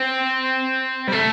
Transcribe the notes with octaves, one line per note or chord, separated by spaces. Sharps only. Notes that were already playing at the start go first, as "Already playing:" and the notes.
Already playing: C4
G3
A3